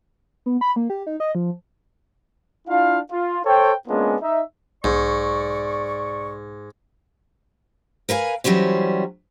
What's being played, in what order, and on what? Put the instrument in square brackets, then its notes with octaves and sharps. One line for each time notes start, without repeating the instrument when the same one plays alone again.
[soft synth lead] B3
B5
A#3
G4
D#4
D#5
F3
[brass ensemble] D4 E4 F4 F5
F4
A4 C5 C#5 G5
G#3 A#3 B3 C#4 D4 F4
D#4 E5
[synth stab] B1 [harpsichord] G#2 [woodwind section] D5 C#6
[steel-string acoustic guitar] A#4 B4 F5 G#5
E3 F#3 G3 C#4 C5